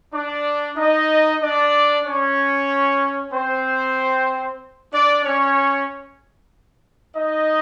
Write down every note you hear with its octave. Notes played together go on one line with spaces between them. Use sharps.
D4 D5
D#4 D#5
D4 D5
C#4 C#5
C4 C5
D4 D5
C#4 C#5
D#4 D#5